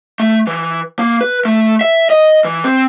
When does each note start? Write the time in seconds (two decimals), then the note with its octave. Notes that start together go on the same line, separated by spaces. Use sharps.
0.20 A3
0.47 E3
0.99 A#3
1.21 B4
1.45 A3
1.81 E5
2.10 D#5
2.45 E3
2.64 C4